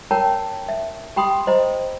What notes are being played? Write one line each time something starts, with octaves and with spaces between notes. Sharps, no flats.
A#4 C#5 G5 A5 A#5
E5
G4 G5 B5 C6 D#6
C5 D#5 A#5